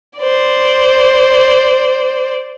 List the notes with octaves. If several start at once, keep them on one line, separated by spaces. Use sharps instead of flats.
C5 D5